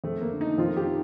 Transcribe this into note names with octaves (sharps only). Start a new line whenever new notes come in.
F2 A3
A#3
D3
D#4
F2 F4
G4
D#3